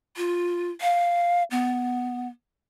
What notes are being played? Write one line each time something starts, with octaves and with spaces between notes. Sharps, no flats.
F4
F5
B3